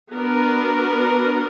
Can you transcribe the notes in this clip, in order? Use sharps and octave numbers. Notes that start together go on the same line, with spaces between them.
B3 D4 F#4 A#4